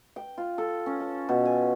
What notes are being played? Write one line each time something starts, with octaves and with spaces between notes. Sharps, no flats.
G5
F4
A4
C#4
A5
B2
G#5